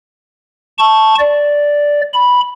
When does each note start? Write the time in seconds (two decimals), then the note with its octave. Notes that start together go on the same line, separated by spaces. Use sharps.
0.78 A5 C#6
1.19 D5
2.13 B5